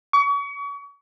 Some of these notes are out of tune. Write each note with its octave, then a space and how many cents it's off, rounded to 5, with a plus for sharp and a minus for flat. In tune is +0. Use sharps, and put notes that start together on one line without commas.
C#6 +35